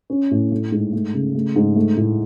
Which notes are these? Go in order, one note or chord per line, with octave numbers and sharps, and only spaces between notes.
C#4
A2
A3
G#2
A3
C#3
A3
G#2
A3
A2